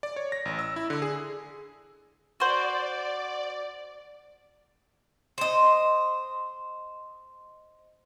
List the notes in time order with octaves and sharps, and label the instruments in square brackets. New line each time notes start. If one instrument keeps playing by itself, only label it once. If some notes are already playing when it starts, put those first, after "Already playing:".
[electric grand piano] D5
C#5
A#6
A1
E6
E4
D3
G#4
[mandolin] F#4 C5 [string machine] D5
[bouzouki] C5 D#5